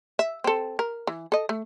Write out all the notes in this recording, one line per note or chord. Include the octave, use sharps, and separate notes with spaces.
E5
C4 A4
A#4
E3
A4 D#5
A3